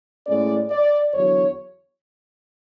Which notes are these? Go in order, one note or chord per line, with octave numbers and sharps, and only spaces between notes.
A2 G#3 C#4 D5
D5
E2 D3 F#3 C#5